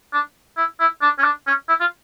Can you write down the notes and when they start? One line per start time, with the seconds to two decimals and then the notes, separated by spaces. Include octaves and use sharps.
0.13 D4
0.57 E4
0.80 E4
1.02 D4
1.18 C#4
1.24 D4
1.47 C#4
1.69 E4
1.80 F4